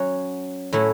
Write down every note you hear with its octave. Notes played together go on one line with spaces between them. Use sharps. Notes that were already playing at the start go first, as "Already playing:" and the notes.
Already playing: F#3 C#4 F#4
A2 F#3 A3 C#4 E4